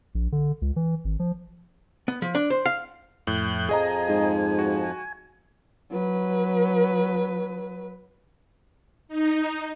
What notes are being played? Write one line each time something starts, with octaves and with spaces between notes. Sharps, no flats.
A#1
D3
C#2
E3
G#1
F3
B3
F3
D4
C5
F5
F2 A2 F#6 G6
F2 F3 G#4 D#5 G#5 A#5
G#2
F#4
F#3 B4
D#4